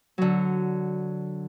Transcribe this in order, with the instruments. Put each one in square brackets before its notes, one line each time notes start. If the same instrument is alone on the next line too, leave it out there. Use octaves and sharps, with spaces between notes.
[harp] D3 F#3